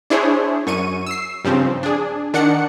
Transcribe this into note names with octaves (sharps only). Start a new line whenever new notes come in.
D4 E4 G#4 C5 C#5
F#2 C#6 D#7
E6 C7
G2 C#3 F3 C4
D4 G#4
D#3 D4 F#5 C#7